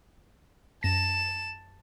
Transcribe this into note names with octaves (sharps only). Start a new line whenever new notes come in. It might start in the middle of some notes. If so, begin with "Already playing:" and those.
F#2 A5 A#6 E7